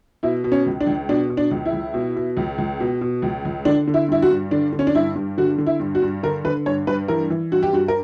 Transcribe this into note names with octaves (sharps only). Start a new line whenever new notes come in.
B2 E4
B2
C#4
C#2
D4
C#2
B2 D4
B2
D4
C#2
E4
C#2
B2
B2
C#2
C#2
B2
B2
C#2
C#2
D3 D4
D3
E4
G2 E4
F#4
G2
D3 D4
D3
C#4
D4
G2 E4
G2
D3 F#4
D3
E4
G2
F#4
G2
D3 A#4
D3 B4
G2 C#5
G2 B4
E3 A#4
E3
G2 F#4
G4
G2 F#4
A#4